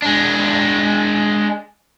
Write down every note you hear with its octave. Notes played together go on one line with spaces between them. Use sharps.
G#3 D4